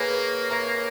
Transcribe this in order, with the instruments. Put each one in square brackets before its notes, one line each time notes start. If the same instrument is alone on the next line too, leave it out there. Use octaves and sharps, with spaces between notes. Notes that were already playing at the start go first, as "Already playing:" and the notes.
Already playing: [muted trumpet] A#3 [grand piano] G#4 B4 C#5
[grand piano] A#4 C#5